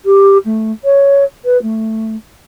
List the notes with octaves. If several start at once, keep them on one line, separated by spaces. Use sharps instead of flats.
G4
A3
C#5
B4
A3